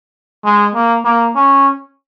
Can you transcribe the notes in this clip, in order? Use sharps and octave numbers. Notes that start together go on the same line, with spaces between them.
G#3
A#3
A#3
C#4